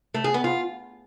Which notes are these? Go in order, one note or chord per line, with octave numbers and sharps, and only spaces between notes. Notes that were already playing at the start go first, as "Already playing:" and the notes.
A3
G#4
B3
F4